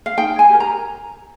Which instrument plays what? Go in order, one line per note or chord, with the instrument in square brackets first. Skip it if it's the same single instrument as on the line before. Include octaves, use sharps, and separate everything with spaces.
[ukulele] F5
D#4 G5
G#5
G4 A#4
A#5